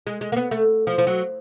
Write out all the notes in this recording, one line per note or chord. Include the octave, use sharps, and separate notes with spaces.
G#3
G#3
A#3
B3
A3
F3
F3
F#3